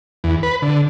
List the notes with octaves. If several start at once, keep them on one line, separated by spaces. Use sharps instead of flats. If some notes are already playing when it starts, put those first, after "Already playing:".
E2
B4
D3